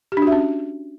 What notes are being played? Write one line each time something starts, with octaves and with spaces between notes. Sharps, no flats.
G4
D4
F#4
E5
C#4